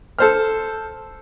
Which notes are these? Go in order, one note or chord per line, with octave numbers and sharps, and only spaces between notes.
A4 C5 F6